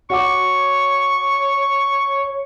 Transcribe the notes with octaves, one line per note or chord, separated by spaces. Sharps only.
F#4 C#5 F#5 C#6 D6